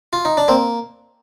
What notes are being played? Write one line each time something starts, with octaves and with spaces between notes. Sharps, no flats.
F4
D#4
D4
A#3 C4